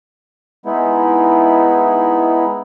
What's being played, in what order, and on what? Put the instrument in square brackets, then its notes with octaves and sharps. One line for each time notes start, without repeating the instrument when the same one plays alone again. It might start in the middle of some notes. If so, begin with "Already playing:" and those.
[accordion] G#3 B3 D#4 E4